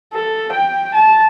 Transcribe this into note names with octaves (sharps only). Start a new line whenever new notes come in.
A4
G5
A5